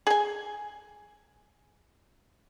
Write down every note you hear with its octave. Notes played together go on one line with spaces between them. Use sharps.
G#4 G#5